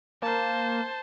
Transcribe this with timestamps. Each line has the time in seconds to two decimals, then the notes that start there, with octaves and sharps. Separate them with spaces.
0.22 A#3 C5 A5